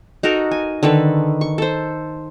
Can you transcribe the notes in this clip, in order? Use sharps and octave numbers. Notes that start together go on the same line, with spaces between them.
D#4 F#4 A4 A#4
G#5
D3 D#3 A4 B4
C#6
A4 C5